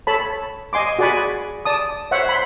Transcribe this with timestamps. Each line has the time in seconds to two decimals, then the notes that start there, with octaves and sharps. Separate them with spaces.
0.07 A4 C#5 A5 B5
0.73 D#5 G#5 C6 D6
0.99 F#4 G#4 D5 F#5 G#5 B5
1.65 D5 A5 D#6
2.11 C5 C#5 E5 F#5
2.29 B5 C6